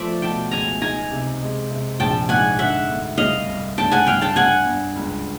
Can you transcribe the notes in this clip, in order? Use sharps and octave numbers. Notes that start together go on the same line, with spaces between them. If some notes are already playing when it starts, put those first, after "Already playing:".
Already playing: F3 A3 C5 D5 E5
B2 G5 A5
C#2 G#5 A#5
D#4 G#5 A#5
C3
G#3
C3
A#1 G5 A5
G#2 F#5 G#5
D3 E5 F#5
D2
C2 D#5 F5
C2
G2 G5 A5
F#5 G#5
G2 F5 G5
G5 A5
G2 F#5 G#5
G2
C#2